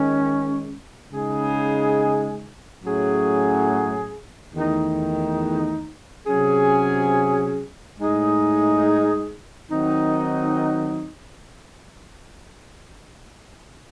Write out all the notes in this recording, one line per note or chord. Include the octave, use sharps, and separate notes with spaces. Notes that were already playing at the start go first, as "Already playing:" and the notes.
Already playing: D#3 G#3 C#4
C#3 G#3 D#4 G#4
A2 F#3 C#4 G#4
E2 D#3 A3 D#4
C3 F#3 C#4 G#4
A2 G#3 D#4 G#4
D#3 F#3 C4 D#4